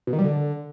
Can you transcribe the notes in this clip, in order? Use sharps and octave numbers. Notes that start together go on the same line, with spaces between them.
B2
D#3
G3
D3